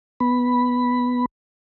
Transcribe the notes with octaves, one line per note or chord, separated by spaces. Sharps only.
B3 B5